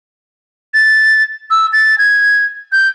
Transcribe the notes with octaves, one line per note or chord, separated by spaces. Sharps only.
A6
E6
A6
G#6
G6